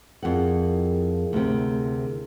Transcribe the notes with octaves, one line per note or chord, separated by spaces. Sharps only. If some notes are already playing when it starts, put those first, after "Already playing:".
F2 E4 G#4 A#4 F#5
D2 C3